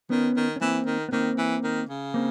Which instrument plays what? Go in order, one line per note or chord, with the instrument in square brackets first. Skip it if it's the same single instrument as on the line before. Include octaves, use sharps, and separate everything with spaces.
[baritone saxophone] D#3 [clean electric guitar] B3 C#4
[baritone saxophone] D#3
[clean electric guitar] C#4
[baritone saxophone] E3 [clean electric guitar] A#3 C4
[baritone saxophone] D#3
[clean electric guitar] B3
[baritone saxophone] D#3 [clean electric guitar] A#3 C4
[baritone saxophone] E3
D#3
C#3
[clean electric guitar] A#3 C4